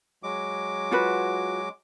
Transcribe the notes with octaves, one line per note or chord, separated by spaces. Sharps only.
F#3 G#3 D6
F4 F#4 B4